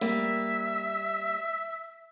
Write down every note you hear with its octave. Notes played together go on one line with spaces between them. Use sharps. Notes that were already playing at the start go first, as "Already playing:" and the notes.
G3 A#3 E5